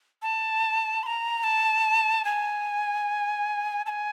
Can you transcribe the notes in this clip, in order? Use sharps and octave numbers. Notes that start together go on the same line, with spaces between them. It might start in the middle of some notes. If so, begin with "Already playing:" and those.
A5
C6
A#5
A5
G#5
A5
G#5